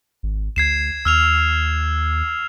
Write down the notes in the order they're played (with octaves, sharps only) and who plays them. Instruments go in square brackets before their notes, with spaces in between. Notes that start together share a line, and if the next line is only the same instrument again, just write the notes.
[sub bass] G#1
[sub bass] D2 [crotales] G#6 C7 E7
[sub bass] D#2 [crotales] E6 F6 F7